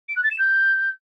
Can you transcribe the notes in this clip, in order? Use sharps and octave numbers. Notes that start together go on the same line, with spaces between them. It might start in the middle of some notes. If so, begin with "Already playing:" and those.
D7
F#6
A6
E7
G6